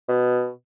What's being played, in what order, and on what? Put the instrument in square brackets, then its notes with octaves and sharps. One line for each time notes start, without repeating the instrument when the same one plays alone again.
[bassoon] B2